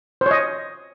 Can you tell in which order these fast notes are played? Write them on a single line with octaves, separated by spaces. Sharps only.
C5 C#5 D#5